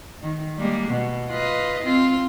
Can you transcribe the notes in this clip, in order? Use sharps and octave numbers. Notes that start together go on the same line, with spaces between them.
D#3
G3 G#3 A#3
B2
F4 B4 D#5
C4 F4